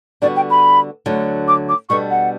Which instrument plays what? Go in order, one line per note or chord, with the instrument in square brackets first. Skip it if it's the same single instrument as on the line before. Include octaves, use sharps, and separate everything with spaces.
[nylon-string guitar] D3 G3 B3 F#4 [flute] D5
[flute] G5
B5
[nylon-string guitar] D2 D3 F#3
[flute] D6
D6
[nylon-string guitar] B2 G3 B3 D4 A4 [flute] C#6
[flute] F#5